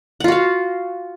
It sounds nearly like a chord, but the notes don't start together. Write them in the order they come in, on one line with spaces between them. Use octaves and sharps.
F#5 F4 F#4 F5